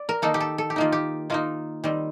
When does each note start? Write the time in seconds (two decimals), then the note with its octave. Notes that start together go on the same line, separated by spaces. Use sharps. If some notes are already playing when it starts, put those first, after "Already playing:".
Already playing: D5
0.09 A#4
0.22 D#3 A#3 D#4 A4
0.34 G4
0.40 A4
0.58 A4
0.70 G4
0.76 D#3 A#3 D#4 F4
0.92 G4
1.30 D#3 A#3 D#4 F4
1.84 D#3 G3 C4